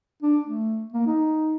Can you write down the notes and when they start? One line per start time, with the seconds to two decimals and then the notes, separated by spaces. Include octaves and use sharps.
0.22 D4
0.46 A3
0.93 A#3
1.06 D#4